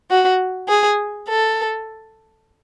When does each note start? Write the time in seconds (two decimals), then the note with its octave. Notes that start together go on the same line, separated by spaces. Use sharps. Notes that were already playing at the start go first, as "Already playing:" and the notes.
0.11 F#4
0.69 G#4
1.29 A4